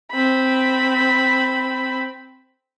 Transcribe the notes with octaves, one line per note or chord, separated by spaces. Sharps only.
C4 B5